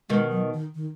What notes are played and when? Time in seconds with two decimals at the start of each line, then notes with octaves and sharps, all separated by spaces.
0.09 B2 D#3 G#3
0.31 F#3
0.54 D#3
0.75 D#3